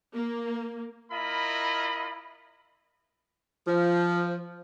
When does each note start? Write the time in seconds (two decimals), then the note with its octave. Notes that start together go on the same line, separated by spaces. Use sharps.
0.14 A#3
1.11 E4 F4 A#4 D#5 B5
3.67 F3